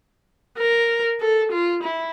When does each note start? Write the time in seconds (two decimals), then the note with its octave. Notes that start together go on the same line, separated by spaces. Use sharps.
0.59 A#4
1.20 A4
1.52 F4
1.83 E4